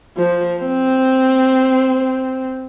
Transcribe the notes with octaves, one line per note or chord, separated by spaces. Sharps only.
F3
C4